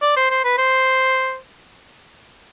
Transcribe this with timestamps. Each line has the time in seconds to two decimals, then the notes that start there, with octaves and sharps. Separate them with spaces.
0.02 D5
0.16 C5
0.30 C5
0.44 B4
0.58 C5